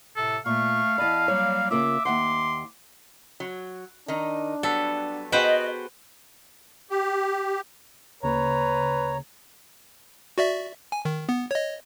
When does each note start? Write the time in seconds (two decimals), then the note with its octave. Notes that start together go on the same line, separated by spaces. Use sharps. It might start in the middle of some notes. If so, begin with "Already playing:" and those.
0.16 A2 C3 A4
0.46 A#2 A3 F5 C#6
0.98 E2 D5 D#5 A5 B5
1.28 F#3 G3 A#3 C#5
1.71 C#3 A#3 F4 E5 D6
2.05 D#2 E5 F#5 C6
3.40 F#3
4.08 D#3 D4 D#4
4.63 F#3 G3 B3 A4
5.32 B3 F#4 G#4 B4 C5 D#5 G5
6.90 G4
8.23 D2 C#3 A#3 B4 C#5 A#5
10.38 F#4 D5 E5
10.92 G#5
11.05 D#3
11.29 B3
11.51 C#5 D#5